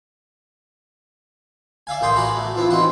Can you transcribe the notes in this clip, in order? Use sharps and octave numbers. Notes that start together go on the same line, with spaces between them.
D5 E5 F5 G#5
A1 A#3 G5 C6 D#6
F#4 D5 G#5 A#5 B5
A3
E3 F3 C4 E4
D#3 C4 F#4 F#5 C6